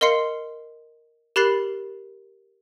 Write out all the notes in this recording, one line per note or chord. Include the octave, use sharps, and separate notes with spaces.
A#4 D#5 F5 C6 C7 C#7
G4 A#4 B5 F#6 A6 C7